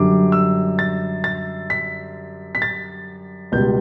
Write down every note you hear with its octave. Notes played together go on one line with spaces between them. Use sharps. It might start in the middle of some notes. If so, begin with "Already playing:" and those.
Already playing: F#2 D3 G3 D6
E6
A6
A6
B6
B6
A6
C#2 B2 G3 G6